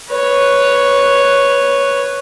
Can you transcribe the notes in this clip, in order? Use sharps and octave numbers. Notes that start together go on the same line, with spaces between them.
B4 C#5